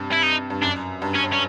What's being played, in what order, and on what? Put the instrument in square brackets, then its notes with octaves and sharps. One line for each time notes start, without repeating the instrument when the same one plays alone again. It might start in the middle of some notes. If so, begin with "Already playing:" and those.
Already playing: [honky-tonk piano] G2 C3
[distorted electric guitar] E4
D#4
[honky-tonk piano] G2
[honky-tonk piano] F#2 [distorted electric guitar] D4
[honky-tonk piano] G2
[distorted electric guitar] C#4
C#4